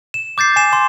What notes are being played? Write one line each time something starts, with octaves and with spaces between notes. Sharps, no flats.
E7
D6 G6 A6 C7
G#5 C7 E7
C6